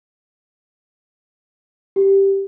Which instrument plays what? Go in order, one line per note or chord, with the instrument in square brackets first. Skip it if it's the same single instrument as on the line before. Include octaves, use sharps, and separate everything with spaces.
[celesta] G4